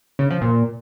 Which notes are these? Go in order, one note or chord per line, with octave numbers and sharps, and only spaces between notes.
C#3
F3
A#2